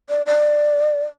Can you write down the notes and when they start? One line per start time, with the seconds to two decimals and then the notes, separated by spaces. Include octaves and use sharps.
0.09 D5
0.26 D5